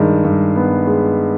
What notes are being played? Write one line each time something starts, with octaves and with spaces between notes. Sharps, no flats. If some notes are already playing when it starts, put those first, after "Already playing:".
Already playing: G2 D#3 G#3
G2
B3
G#3